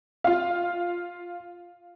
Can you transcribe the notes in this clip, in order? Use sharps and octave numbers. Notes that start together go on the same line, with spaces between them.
F4 F5